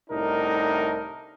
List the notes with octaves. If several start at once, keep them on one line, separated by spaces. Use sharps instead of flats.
C2 A2 D4 D#4 A#4